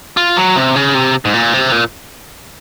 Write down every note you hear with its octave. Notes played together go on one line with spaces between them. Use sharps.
F4
F#3
C3
C#3
C3
G#2
A#2
C3
A#2